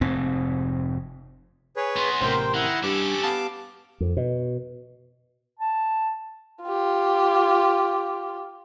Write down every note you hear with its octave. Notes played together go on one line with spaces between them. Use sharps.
F1 G#2 C4
G#4 B4 C#5
B3 D#4 C6
A1 C3 A#4 C5 G5
D#3 E4 F#5
G2 C#4 G4 A4 D6
B3 F5 A5 D6
F2
B2
A5
F4 G4